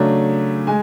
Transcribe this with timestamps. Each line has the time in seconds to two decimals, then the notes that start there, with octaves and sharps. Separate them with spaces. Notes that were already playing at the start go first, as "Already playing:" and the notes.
Already playing: C#3 F#3 A3 D4
0.67 G#3 G#5